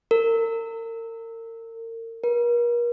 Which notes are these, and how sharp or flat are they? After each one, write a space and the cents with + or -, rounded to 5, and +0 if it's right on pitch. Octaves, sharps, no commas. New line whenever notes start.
A#4 -35
A#4 +40